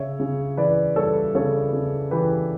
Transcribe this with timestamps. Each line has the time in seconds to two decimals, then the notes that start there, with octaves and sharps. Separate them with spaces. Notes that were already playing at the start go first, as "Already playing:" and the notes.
Already playing: C#3 C#5 E5
0.20 C#3
0.57 E3 B4 D5
0.96 G3 A4 C#5
1.35 C#3 A4 C#5
1.73 C#3
2.11 E3 G4 B4